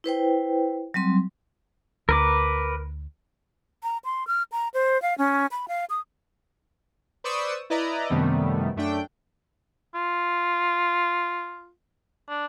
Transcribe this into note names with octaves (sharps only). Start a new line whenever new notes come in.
E4 B4 C5 G5
F#3 G3 C4 C6
D2 A#4 B4 D6
A#5
C6
F6
A#5
C5
F5
C#4
B5
F5
D#6
B4 C5 D5 C#6 D#6 E6
E4 B4 D5 D#5 A#5
F#2 C3 D#3 G3 A3 B3
F#2 A3 D4 G5
F4
D4